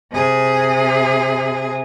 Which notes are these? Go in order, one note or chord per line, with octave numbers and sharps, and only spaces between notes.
C3 G#4